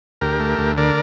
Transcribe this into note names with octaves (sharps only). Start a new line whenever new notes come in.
D2 G4 A#4
A3
D2
D3 A#4 D5